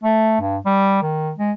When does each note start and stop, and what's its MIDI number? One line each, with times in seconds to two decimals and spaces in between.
0.04 0.37 57
0.41 0.57 43
0.66 1.01 55
1.02 1.31 51
1.38 1.52 56